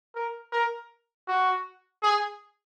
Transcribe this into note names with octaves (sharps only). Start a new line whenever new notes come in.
A#4
A#4
F#4
G#4